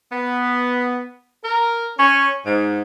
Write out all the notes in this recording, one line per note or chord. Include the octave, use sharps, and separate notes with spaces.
B3
A#4
C#4
G#2